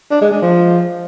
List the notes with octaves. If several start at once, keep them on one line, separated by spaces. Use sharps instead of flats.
D4
G#3
G#3
F3